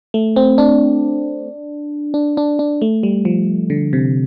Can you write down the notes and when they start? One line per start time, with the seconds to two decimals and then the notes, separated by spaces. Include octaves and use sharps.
0.14 A3
0.36 C4
0.58 D4
2.14 D4
2.37 D4
2.59 D4
2.82 A3
3.03 G3
3.25 F3
3.70 D3
3.93 C3